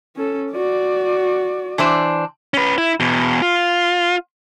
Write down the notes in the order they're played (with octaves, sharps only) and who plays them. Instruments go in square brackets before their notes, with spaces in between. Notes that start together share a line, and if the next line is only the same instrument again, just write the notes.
[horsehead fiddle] C#4 A4
F#4 D5
[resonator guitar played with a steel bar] E3 D4 C5
[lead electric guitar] C#4 B4
E4
E2 B2
F4